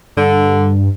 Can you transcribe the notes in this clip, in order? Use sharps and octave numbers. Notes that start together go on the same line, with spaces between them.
G2 D3